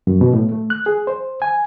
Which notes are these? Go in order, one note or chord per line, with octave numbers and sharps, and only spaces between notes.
F#2
B2
A2
A3
F#6
G#4
C5
G#5